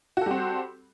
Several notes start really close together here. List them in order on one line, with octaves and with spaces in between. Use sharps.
F#4 A4 G3 C4